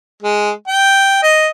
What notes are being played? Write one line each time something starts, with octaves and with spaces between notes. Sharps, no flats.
G#3
G5
D#5